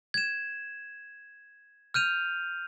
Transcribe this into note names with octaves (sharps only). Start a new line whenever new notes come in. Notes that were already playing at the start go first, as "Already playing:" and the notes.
G#6 E7
F6 G6 D#7 F7